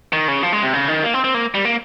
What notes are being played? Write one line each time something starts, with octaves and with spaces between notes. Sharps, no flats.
D#3
C#3
F3
G#3
C3
C#3
D#3
A#3
C4
C4
A#3
G3
A#3